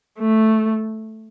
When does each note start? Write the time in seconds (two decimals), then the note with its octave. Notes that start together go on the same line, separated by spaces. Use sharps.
0.19 A3